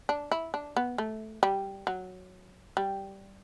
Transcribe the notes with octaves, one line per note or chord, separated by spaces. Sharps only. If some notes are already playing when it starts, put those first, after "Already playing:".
D4
E4
D4
B3
A3
G3
F#3
G3